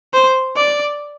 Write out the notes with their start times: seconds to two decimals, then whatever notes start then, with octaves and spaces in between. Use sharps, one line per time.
0.14 C5
0.57 D5